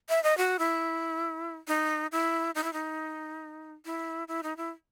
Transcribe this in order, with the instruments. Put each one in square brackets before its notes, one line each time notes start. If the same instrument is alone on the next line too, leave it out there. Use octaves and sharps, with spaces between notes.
[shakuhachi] E5
D#5
F#4
E4
D#4
E4
D#4
E4
D#4
E4
E4
D#4
E4